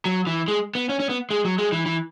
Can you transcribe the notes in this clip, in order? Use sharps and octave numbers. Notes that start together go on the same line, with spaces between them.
F#3
E3
G#3
B3
C#4
C#4
B3
G#3
F#3
G#3
E3
E3